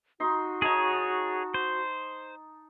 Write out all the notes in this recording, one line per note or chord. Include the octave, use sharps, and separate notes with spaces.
D#4 F#4 C6
D#4 G#4 C#5 A5
C5